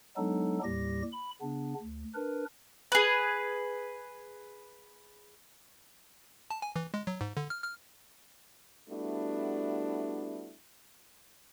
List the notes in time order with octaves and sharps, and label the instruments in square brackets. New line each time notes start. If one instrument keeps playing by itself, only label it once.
[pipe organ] F#3 G#3 B3 D4 D#4 A4
D#2 A2 G3 G4 A#6
B5
C#3 B3 D4
D2
D4 A#4 B4
[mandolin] G#4 B4
[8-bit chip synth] A5
G#5
E3
G#3
F#3
G#2
D3
F6
F6
[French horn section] G3 A3 B3 D4 E4 F#4